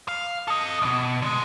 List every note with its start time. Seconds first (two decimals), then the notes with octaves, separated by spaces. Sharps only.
0.08 F5
0.48 A4 D#5
0.82 C2 B2
1.22 D3 G#3